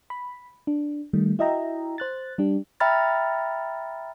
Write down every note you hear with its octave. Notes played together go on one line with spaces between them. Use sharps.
B5
D4
D#3 G3 A3
E4 F#4 D#5 E5 G5 A#5
C5 F#6 A6
G3 D4 G4
E5 G5 A#5 B5 F6 A6